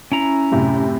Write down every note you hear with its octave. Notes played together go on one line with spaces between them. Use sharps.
C#4 E4 A#5
F#2 A2 C3